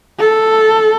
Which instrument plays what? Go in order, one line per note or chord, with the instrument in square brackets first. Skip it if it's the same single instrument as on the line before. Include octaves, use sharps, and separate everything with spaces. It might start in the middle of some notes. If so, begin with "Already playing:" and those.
[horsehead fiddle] A4